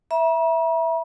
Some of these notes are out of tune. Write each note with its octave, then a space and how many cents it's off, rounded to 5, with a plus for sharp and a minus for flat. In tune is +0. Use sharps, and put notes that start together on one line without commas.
E5 +0 A#5 +45